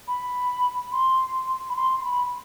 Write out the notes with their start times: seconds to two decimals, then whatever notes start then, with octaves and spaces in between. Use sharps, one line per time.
0.08 B5
0.92 C6
1.70 B5
1.76 C6
2.00 C6
2.04 B5